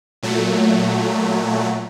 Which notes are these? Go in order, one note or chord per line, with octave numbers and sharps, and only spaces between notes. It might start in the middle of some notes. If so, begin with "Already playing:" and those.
A#2 F#3 A3